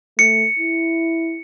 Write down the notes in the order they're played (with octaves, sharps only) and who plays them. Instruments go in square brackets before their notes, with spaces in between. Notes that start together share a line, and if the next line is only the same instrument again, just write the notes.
[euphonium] A3 [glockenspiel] C#7
[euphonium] E4